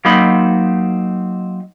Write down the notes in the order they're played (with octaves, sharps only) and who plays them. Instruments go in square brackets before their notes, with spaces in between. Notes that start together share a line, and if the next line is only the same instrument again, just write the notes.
[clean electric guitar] F#3 A#3 C4 D#4 B5